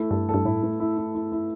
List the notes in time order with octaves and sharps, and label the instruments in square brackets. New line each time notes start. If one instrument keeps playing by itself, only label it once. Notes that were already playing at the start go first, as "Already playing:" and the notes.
Already playing: [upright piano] A3 E4
[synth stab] G2 [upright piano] A4
[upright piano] A4
[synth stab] G2
[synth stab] A2 [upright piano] E4
[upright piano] A3
E4
E4
E4
E4